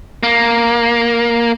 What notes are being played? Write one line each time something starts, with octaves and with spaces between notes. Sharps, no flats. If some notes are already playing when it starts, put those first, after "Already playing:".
A#3